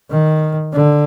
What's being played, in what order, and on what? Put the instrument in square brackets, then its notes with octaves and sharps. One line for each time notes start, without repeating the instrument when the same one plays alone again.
[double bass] D#3
D3